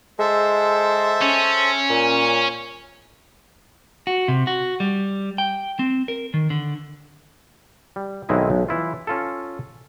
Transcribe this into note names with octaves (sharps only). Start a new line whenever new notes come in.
G#3 A4 C5 E5
C#4
A#2
F#4
C3
F#4
G3
G5
C4
A#4
D#3
D3
G3
B1 D#3 G#3 C4 E4 D#5
B1
E3 E4 F4
C#4 F4 A4